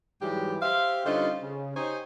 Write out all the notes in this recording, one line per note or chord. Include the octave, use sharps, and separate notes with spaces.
G#2 E3 F#3 G3 G4
G4 C5 E5 F5
D3 G3 C#4 D#4 F4 C5
C#3
D#4 G4 C5 C#5 D#5 G#5